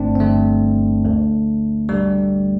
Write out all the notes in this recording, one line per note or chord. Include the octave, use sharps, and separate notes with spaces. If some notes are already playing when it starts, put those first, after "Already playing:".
Already playing: G1 G2 D3 A3 C4 D4
C4
G1 G2 D3 A3
D2 D3
D2 D3 G3